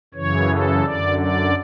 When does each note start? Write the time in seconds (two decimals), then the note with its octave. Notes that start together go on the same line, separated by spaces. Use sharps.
0.14 F#2 C#3 E3 C#5
0.49 A4
0.84 F#2 D3 D5
1.19 D5